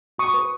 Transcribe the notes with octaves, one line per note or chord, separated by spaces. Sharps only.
F#4 C#6 D#6
B4